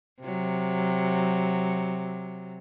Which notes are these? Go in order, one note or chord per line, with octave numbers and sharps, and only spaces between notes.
C3 F#3